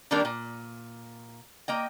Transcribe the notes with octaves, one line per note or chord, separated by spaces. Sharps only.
D#3 G3 A#3 D4 G4 A#4
A#2
A#3 D#5 G5